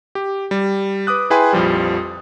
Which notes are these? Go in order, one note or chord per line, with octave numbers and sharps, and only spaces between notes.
G4
G3
B4 D6 D#6 F#6
E4 G#4 B4 G5 G#5 C6
A#1 F2 F3 G3